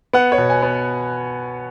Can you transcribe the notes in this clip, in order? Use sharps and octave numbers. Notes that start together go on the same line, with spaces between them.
B3 F#5
C#5
B2
G#5
B3